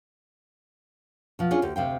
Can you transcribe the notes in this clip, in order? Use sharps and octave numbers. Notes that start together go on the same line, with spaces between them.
B2 F3
C#4 D4 F4 G#4
D2 G4
D2 C3 F5 G5